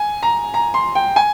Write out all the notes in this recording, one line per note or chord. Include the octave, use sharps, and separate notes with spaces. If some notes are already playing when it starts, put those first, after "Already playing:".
Already playing: G#5
A#5
A#5
C6
G5
G#5